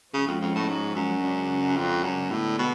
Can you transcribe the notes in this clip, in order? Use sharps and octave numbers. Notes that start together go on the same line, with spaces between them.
C#3 F3 G#3 C#4 F#4
F2
F2
A2
G#2
F#2
C#3 G#3 D4 F#4
F2
F#2
A2 D3 G#3 B3
B2